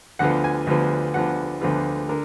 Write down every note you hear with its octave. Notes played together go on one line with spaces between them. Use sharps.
D2 D3 F3 B3 F4 F#5
G#5
D2 D3 F3 B3 F4
D2 D3 F3 B3 F4 F#5
D2 D3 F3 B3 F4
D3 A#4